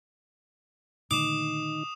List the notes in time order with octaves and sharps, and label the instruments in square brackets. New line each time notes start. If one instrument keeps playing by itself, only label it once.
[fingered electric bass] A#2 D3 A3 [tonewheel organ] D#3 D#4 [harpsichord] D6 [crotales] D#6 E7